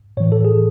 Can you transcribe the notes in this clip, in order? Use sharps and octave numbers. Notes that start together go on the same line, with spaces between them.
A2 E3 C#5
A4
G#4